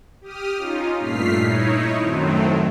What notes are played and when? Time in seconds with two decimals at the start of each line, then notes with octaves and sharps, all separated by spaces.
0.21 G4 D#6 F6
0.57 C#4 D#4 F4
0.99 G2 A#2 A3 F6 B6 C7
1.37 D#4 E4 C#5
1.96 F#2 A2 D#3 F#3 A3 C4